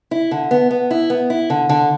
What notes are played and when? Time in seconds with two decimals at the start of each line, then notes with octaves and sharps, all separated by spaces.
0.11 E4
0.31 D3
0.51 B3
0.71 B3
0.91 E4
1.10 B3
1.30 E4
1.50 D3
1.69 D3